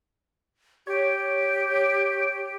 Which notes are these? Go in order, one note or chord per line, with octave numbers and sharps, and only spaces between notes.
G4 C#5